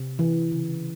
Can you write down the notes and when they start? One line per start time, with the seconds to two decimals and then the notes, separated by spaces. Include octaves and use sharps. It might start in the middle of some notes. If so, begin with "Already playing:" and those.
Already playing: C3
0.19 E3
0.52 C#3